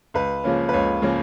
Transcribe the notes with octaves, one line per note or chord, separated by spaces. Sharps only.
C#2 B4
C#3 F3 A#3 C#4
B4
C#2 C#5
C#3 F3 A#3 C#4